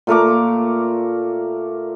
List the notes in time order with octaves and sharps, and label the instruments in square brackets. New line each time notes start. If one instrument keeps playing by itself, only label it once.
[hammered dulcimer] A#2 A3 A#4 D6